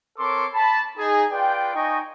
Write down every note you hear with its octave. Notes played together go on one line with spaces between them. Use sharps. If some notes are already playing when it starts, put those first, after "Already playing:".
C4 A4 A#4 C#5 C6 D6
A5 B5
D#4 G#4
F4 B4 D5 G5
D#4 D#5 G5 G#5 C#6